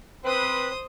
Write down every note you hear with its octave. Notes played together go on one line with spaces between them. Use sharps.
C4 B4 C5 D#6